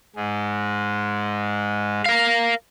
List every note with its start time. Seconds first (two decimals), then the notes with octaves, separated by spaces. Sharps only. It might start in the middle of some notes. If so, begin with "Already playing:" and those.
0.16 G#2 G#3
2.06 A#4 F5